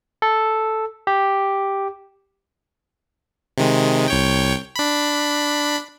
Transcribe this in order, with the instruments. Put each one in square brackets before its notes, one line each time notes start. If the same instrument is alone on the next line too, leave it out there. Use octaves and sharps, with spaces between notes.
[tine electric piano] A4
G4
[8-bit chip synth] C3 D#3 G#3
C2 C#5 G5
D4 B5